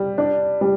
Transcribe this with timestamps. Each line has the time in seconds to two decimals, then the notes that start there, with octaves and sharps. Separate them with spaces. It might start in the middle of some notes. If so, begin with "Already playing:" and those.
Already playing: G3
0.18 D4
0.61 G3